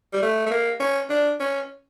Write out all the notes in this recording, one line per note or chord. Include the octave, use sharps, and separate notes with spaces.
G3
A3
A3
A#3
C#4
D4
C#4